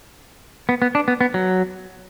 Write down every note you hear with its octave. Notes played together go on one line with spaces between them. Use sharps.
B3
B3
D4
B3
B3
F#3